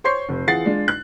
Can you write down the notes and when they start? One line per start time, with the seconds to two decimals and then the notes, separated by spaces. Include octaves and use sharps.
0.04 C5 C#5 C6 C#6 G6 C7
0.29 F1
0.47 E3 F4 G#4 F#5 A6 C7
0.65 G#3 D4 F4
0.88 F#6